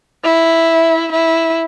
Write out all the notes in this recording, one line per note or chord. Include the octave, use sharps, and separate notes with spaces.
E4
E4